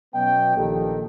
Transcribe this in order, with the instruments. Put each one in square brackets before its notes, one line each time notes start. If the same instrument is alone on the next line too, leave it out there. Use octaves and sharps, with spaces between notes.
[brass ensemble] B2 F#3 B3 C#4 D#5 G5
A#1 D#3 G4 A4